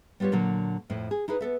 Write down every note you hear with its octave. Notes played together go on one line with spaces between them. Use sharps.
G3 B3 F4 G4 C#5
A#2 D3 F#3
F2 A2 F3
G#4
D#4 E4 G#4 B4
B3 A4 E5